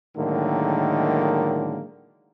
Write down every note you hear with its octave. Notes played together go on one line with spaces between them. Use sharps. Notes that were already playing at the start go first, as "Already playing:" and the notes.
A2 D3 D#3 F#3 G#3 A#3